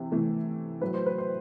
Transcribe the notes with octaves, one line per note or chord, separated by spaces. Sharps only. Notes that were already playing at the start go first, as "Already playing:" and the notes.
Already playing: C3 E3
C3 E3 A3
A2 F#3 A3 B4
C5
B4
C5